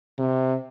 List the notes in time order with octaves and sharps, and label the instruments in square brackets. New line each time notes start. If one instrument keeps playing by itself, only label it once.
[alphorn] C3